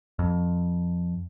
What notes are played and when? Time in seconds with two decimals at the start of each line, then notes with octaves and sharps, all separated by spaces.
0.19 F2